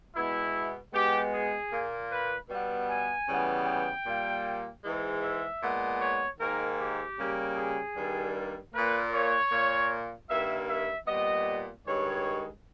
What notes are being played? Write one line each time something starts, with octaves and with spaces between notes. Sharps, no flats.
B2 G#3 B3 E4
B2 G#3 B3 G4
G#4
A#2 A#3
B4
B2 G3 B3
G#5
C#3 E3 G3 B3
G5
A#2 G3 A#3
G#2 E3 G#3
E5
A#2 G#3 B3
C#5
G#2 D#3 A#3 A#4
G4
C#3 G3 A#3
G#4
G2 D#3 G3 A#3
A#2 A#3 B4
C#5
A#2 A#3
G2 D#3 A#3 E5
E5
A#2 G3 B3 D#5
G2 D#3 G#3 C#5